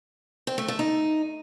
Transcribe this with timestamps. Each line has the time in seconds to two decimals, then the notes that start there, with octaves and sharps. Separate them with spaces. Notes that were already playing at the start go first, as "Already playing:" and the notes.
0.47 C4
0.58 A3
0.68 A3
0.79 D#4